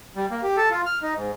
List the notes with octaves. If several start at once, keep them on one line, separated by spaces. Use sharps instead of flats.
G3
A#3
G4
A4
F4
F6
D#4
G#2